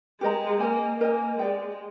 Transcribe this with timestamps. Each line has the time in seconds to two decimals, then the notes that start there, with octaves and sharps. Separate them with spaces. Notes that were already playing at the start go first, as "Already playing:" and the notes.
0.21 G#3 G4 A#4 D#5 A#5
0.60 A#3 A#4 D#5 G#5
1.00 A#3 A#4 D#5 G#5
1.39 G#3 G4 D5 G5